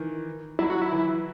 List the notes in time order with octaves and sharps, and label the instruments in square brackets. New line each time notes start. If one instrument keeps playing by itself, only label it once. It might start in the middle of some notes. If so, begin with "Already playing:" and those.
Already playing: [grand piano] D#3 E3
[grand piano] F#3 [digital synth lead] E4
[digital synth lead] F#4
E4
[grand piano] E3